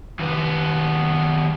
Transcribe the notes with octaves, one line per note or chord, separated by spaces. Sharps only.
D#2 B3